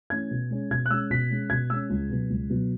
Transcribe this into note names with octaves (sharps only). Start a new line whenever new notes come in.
E3 A3 C#4 G#6
B2
G#3 C#4
B2 G#6
F#6
G#3 C#4 E6
B2 B6
G#3 C#4
B2 G#6
G#3 C#4 E6
C#2
B2 F#3 B3
C#2
B2 F#3 B3